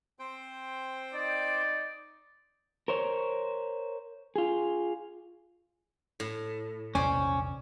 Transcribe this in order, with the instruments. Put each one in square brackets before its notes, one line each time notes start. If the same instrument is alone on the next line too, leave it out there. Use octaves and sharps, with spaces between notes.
[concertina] C4 C5 G5
[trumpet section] D#4 D5
[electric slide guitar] A#4 C5 C#5
F4 G#4
[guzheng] A2
[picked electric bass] A#1 E2 C3 [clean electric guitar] C#4 [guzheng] C5 D5 G#5